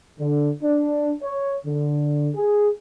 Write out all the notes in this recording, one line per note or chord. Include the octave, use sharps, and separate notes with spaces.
D3
D4
C#5
D3
G#4